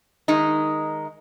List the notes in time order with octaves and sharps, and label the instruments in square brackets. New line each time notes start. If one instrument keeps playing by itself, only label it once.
[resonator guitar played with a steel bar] D#3 G#3 D#4